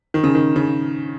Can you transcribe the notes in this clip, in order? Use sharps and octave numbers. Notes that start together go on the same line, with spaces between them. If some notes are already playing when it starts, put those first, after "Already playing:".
D#3
C#3
D#3
C#3